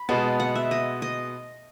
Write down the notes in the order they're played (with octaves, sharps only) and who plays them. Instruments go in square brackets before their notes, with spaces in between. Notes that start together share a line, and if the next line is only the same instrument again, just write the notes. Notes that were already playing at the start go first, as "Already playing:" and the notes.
Already playing: [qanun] B5
[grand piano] B2 G#3 B3 [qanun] A5
[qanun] F#5
E5
D#5
D#5